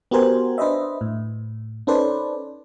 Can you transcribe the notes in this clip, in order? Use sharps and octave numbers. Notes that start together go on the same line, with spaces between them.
B3 F#4 G4 A#4 C5 G#5
D4 B4 C5 D#5 E5
A2
C#4 D#4 A4 B4 C5 D5